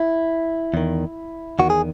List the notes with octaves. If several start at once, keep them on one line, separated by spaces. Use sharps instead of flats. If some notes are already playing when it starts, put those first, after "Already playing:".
Already playing: E4
E2 D#3
E2 D#3 F#4
G#4